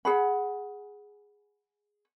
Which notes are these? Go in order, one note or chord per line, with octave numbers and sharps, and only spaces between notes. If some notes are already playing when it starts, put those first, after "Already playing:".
G#4 F#5 B5